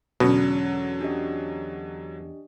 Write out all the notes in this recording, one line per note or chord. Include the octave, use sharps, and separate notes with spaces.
E2 B2 D3 F#3 C#4
D4 G4 D#5